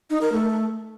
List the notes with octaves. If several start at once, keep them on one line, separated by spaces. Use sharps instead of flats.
D#4
A#4
A3